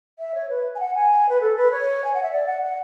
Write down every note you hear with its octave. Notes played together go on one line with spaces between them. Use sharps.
E5
C#5
B4
G#5
F#5
G#5
B4
A4
B4
C#5
G#5
F#5
E5
D5
F#5
F#5